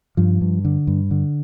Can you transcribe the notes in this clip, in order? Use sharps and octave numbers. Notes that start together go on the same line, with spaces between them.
G2 F3
G2
D3
G2
D3